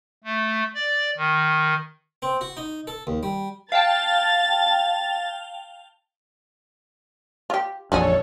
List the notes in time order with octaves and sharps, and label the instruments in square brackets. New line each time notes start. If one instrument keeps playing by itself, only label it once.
[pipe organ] A3
D5
D#3
[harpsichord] C4
F#4
D#4
A4
D#2
G3
[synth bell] F5 G5 A5 [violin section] A6
[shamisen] F4 G4
[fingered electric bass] A1 F2 A#2 [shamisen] D3 F#4 G#4 [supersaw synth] A4 C#5